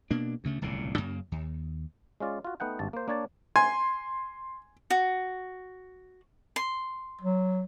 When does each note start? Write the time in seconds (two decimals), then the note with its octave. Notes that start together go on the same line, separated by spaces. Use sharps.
0.11 B2 A#3 D4
0.44 D2 C#3 A3
0.62 D1 C2 A#2 C#3
0.98 F#2 C#3 A#3
1.32 D#2
2.20 G#3 C#4 F4 D5
2.45 F4 F#4
2.60 A3 B3 D#4 F#5 G5
2.79 G#1 G2 A5
2.93 A#3 C5
3.08 A#3 D4 C#5 D5 A5
3.56 G#5 C6
4.90 F#4
6.56 C6
7.21 F#3